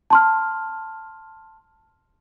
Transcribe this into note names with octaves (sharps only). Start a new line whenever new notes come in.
A5 C6 F6